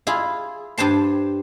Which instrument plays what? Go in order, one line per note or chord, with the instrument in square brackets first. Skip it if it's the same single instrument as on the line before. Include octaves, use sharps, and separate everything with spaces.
[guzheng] E4 F4 G#4
G2 C5 A5 C6